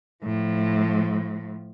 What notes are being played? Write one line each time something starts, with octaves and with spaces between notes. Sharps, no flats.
A2 F3